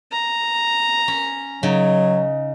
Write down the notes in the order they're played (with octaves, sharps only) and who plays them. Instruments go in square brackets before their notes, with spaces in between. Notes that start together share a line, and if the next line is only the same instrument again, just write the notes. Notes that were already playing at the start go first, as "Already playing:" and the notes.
[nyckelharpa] A#5
[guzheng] C#4
[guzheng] C#3 D#4 [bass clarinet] F#3